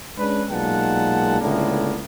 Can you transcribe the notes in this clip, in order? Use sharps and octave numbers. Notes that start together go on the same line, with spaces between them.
G#3 C#4 D4 B4
B1 A#2 G#3 F#5 A5
C#2 A2 D3 A#3 B3